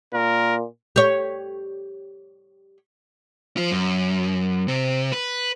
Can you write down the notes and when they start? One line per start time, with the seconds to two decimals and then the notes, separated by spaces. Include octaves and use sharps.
0.14 A#2 A#4
0.96 G4 C#5
3.57 F3 F4
3.71 F#2
4.68 C3
5.13 B4